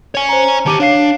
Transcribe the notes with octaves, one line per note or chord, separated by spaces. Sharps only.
C#5 G#5
C5 A#5
D#3 G4 A5 D6 D#7
D4 C#5 F5 C7